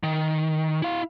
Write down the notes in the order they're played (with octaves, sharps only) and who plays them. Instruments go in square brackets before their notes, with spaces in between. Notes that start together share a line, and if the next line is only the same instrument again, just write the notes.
[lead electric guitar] D#3
E4 F5